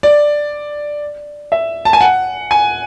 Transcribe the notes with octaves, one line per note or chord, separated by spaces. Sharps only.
D5
E5
A5
G#5
F#5
G#5